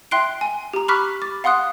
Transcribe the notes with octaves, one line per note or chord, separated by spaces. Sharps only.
E5 G5 C6 F#6 C7 D7
G#5
G4 A#5
B5 C#6 D6 F6 F#6 B6
D6 A6
F5 F#5 C6 D#6 F#6